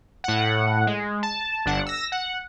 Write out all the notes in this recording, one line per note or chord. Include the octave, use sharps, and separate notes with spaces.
A2 F#5
G#3
A5
G1 D4 F#5
E6 A#6
F#5